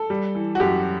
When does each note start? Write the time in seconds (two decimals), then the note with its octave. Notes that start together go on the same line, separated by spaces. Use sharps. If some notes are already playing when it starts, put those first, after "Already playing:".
Already playing: A4
0.10 G3
0.35 E3
0.55 F#4
0.60 F#2 G4